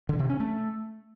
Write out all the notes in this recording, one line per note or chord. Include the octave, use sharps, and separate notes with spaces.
D3
C3
C#4
A3